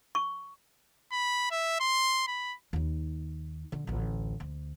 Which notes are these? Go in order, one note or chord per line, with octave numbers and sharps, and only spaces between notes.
C#6
B5
E5
C6
B5
D#2 D#4
D3
A1 D2
D2